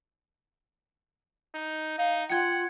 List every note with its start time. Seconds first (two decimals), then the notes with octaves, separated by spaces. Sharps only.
1.55 D#4
1.98 D#4 F5
2.30 F4 F#5 G5 G#6 C#7